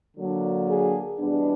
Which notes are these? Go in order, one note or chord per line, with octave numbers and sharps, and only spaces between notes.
D3 F#3 A#3 D4
G#4
E2 B2 G3 B3 D4